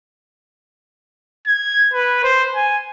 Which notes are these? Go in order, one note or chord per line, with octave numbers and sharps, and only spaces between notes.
G#6
B4
C5
G#5